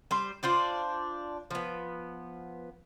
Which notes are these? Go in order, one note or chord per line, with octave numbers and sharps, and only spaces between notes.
G3 C5
D4 F4 C5 D5
F3 B3